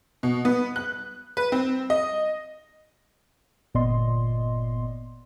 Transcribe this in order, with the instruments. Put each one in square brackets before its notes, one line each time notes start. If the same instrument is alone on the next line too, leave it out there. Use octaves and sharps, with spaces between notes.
[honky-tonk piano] B2
B3
F#6
B4
C4
D#5
[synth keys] G1 A#2 B3 D5 D#5 C6